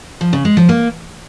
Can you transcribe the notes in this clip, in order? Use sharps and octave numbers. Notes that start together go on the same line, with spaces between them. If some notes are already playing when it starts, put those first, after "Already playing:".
F3
C#3
G#3
F3
A#3